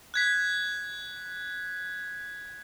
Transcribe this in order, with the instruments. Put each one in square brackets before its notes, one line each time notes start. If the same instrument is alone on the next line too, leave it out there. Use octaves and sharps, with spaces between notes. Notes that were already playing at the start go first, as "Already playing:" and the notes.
[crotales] F#6 G#6 B6